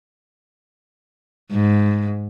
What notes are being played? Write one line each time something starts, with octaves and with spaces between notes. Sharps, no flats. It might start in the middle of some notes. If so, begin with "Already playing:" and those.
G#2